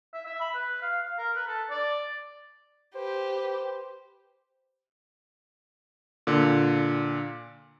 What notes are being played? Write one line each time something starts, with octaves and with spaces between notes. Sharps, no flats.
E5
E5
B5
B4
F5
F5
A#4
B4
A4
D5
G4 B4 C5
A#2 D3